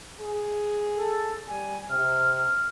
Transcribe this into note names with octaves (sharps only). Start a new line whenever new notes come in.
G#4
A4
G3 G#5
C3 F6